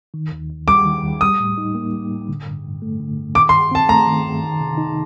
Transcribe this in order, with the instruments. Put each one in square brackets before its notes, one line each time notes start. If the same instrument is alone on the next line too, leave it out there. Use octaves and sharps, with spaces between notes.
[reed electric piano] D#3
D#2
D#2
[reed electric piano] G3 [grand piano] D6
[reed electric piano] D#3
D#2
[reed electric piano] G3 [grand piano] D#6
[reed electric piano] A2
D#4
A#3
G3
A2
D3
G2
G2
A3
D3
G2
[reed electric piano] D#3 [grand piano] D6
[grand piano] C6
[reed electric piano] G2
[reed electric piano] C4 [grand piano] A5
[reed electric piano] A3 [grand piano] A#5
[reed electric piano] D#3
G2
D#3
C3
D#4